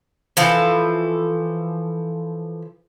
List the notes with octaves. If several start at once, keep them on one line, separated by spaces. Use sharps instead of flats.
E3 F3 A4